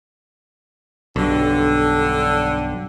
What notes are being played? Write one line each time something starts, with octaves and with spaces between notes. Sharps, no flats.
B1 G2 D3